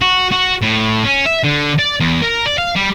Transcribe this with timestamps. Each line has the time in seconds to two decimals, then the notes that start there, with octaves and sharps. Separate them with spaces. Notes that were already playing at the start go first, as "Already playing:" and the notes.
0.01 F#4
0.32 F#4
0.62 A2
1.05 C#4
1.26 E5
1.44 D3
1.79 D5
2.00 E2
2.22 A#4
2.46 D5
2.58 F5
2.76 G3